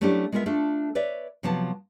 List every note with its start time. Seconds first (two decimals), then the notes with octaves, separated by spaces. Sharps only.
0.01 F#3 A3 C#4 D4 E4 G4
0.32 G#3 B3 F4 A#4 E5
0.46 A3 D4 F4 A4
0.95 B4 C#5 D5 E5
1.43 C3 F3 F#3 B3 A5